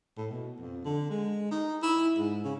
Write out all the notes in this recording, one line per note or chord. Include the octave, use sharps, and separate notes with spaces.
A2
B2
F2
D3
G#3
D#4
E4
G#2
C#3